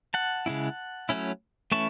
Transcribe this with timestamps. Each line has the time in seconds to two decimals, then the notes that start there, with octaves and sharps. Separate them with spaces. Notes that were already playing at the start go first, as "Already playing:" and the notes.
0.14 F#5 A5
0.46 C#3 G#3 C#4 E4
1.09 F#3 A3 C#4 E4
1.72 E3 A3 C#4 E4 A5 C#6